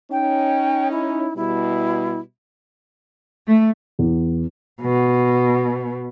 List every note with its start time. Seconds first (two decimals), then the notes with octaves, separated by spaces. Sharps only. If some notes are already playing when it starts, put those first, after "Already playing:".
0.12 C#4 D#4 G5
0.91 E4
1.37 B2 G3 E4
3.47 A3
3.99 E2
4.81 B2